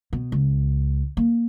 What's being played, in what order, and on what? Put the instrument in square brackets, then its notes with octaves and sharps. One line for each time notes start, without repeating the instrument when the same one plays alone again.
[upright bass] B2
C#2
A#3